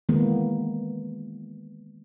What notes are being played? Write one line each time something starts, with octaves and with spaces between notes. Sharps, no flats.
D#3 E3 G#3 A#3 B3